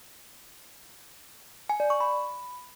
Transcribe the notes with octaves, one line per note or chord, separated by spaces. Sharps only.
G#5
D5
C#6
B5